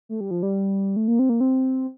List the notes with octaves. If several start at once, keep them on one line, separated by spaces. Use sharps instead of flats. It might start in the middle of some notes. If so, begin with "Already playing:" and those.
A3
G3
F3
G3
A3
A#3
C4
A#3
C4